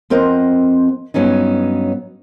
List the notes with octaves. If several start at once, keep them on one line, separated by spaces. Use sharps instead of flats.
F2 C4 A#4 C5 D#5 F#5
G2 F#3 B3 C#4 D#4